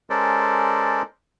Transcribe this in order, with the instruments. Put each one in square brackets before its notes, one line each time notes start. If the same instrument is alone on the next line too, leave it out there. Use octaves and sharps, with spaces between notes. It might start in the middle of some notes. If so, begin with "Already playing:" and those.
[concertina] G#3 C#4 A4 A#4 C5 D5